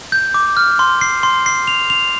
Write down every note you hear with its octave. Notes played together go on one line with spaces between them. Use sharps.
G6
D6
F6
C6
C7
C6
C7
F7
F7